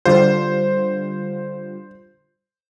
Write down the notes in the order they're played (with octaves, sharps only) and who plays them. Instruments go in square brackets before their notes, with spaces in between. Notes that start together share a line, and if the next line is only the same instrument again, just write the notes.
[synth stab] D3 G3 F4 [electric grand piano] C5